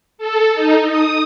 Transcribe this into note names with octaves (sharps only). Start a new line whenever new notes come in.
A4
D#4
D#6